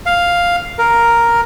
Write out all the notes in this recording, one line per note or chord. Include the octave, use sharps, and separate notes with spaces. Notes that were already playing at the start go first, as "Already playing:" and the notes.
F5
A#4